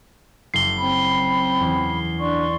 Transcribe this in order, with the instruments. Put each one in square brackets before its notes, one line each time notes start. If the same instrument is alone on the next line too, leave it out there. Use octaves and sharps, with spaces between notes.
[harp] F#1 [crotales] C7 G7
[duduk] C4 [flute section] B5
[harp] E2
[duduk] D4 [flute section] D5 C6 C#6